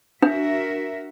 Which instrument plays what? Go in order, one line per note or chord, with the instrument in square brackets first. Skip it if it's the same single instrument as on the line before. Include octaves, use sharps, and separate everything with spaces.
[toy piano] D4 [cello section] F#4 A#4 E5